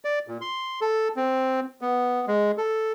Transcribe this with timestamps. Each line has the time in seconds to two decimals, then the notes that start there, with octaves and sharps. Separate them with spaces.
0.04 D5
0.28 A#2
0.41 C6
0.81 A4
1.16 C4
1.81 B3
2.28 G#3
2.58 A4